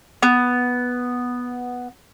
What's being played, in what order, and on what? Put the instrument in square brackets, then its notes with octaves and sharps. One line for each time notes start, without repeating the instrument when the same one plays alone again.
[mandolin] B3